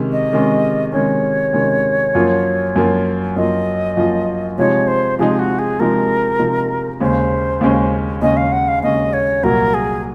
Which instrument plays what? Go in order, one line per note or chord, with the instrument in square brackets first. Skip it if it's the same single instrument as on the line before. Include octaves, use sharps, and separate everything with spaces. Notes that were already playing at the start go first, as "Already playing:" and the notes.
Already playing: [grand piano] C3 D#3 G#3 C#4
[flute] D#5
[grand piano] C3 D#3 G#3 C#4
[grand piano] C3 D#3 G#3 C#4 [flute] C#5
[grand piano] C3 D#3 G#3 C#4
F#2 F3 A#3 F4
F#2 F3 A#3 F4
[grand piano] F#2 F3 A#3 F4 [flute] D#5
[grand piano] F#2 F3 A#3 F4
[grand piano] C3 F3 G#3 D#4 [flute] C#5
[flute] C5
[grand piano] C3 F3 G#3 D#4 [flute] G#4
[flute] F#4
G#4
[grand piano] C3 F3 G#3 D#4 [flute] A#4
[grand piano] C3 F3 G#3 D#4
[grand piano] D#2 C#3 G#3 C#4 [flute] C5
[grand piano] D#2 C#3 G#3 C#4
[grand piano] D#2 C#3 G#3 C#4 [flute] D#5
[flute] F5
F#5
F5
[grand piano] D#2 C#3 G#3 C#4 [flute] D#5
[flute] C#5
[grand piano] C2 A#2 F#3 [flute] A#4
[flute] G#4